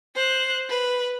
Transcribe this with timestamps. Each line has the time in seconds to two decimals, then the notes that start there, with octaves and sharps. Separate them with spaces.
0.15 C5 F#6
0.70 B4